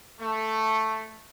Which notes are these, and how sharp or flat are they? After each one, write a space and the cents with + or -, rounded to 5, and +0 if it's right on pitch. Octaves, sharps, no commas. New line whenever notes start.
A3 +0